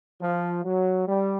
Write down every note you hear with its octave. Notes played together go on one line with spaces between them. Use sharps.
F3
F#3
G3